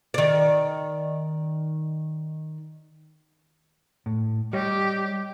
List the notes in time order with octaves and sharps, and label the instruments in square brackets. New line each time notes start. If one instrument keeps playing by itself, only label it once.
[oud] D#3 D5
[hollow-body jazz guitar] A2
[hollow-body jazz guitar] G3 C#5 D#5 [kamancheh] G4